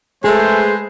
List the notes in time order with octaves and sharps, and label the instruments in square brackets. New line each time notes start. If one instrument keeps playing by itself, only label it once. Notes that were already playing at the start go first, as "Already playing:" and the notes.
[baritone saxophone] G#3 [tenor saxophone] A3 [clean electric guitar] G#4 [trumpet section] B4 C5